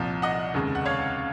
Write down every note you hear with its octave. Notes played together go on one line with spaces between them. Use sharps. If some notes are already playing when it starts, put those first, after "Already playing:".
Already playing: C2 A#2 F3
D#5 F#5
F1 D#2 C#3 G#3
F#5
C#5 F5